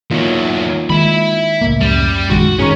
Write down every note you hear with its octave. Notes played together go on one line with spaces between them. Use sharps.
E2 F#3 A#3 D#4 F4
D#3 G#3 E5 B5
C#2 A2 A#3
F#2 G3
A#1 D#3 G#3 F#4
G#2 D#3 C#4 G#4 A#5 C#6